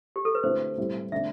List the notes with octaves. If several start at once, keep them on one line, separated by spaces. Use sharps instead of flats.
G4
A4
B4
D3 F#3 A3 C4 E4 C5
A2 G3 C4 E4
D3 A3 D4 E5